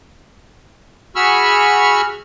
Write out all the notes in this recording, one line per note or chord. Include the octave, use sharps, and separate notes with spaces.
F#4 G#4 B5 C#6 E6 F6